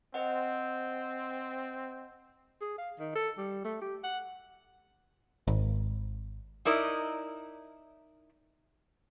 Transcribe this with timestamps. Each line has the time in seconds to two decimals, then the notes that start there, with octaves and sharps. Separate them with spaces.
0.14 C4 C5 D#5 F#5
2.61 G#4
2.78 F5
2.99 D#3
3.15 A4
3.38 G3
3.65 A3
3.81 G4
4.04 F#5
5.47 G#1
6.65 D#4 E4 A#4 D5 D#5